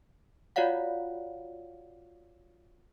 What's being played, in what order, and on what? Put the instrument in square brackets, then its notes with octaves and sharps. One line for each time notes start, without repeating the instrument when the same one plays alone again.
[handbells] F4 F#4 C#5 D5 F5 F#5